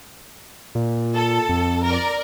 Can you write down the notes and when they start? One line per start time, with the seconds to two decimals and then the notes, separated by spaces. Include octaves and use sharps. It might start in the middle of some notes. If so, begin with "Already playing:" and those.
0.75 A#2
1.15 A4
1.49 F2
1.84 A#4 D5